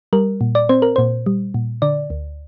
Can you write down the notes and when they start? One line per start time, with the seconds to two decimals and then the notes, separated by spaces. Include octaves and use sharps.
0.13 G3 A#4
0.41 A#2
0.55 D5
0.69 C4 C5
0.82 A#4
0.96 A#2 C5
1.26 G3
1.54 A#2
1.82 D3 D5
2.10 D2